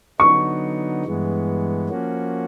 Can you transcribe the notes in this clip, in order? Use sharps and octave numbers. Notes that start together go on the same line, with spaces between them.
D3 F#3 B3 D#4 C#6
G2 E3 G#3 B3
F3 A#3 C#4 F#4